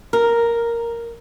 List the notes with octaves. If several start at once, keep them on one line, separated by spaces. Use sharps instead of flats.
A#4